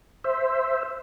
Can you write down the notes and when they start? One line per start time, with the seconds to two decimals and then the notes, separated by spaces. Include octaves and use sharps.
0.24 C5 E5